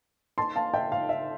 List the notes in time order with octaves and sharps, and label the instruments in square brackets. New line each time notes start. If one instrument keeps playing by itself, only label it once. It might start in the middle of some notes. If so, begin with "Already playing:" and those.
[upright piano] A5 C6
F5 A5
E5 G5
F5
E5